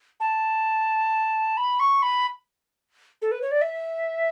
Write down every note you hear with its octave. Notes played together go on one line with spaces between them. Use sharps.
A5
B5
C#6
B5
A4
B4
C#5
D5
E5